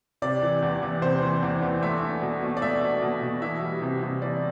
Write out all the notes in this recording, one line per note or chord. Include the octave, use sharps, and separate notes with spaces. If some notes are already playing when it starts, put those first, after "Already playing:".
C3 D5
E3
E2
E2
C3 C5
E3
E2
E2
A3 E5
D4
B2
B2
D5
A3 E5
D4
B2
B2
E3 E5
G3
C3
C3
E3 D5